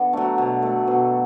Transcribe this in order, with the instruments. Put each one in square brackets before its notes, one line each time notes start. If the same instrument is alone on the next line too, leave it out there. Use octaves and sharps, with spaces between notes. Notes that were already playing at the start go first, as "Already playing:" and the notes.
Already playing: [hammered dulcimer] D3 B3
F#3 A3 D4
B2
A3
B2